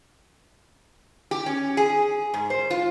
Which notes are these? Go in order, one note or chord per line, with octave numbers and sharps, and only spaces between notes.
G4
C#4
G#4
G#2
C5
F4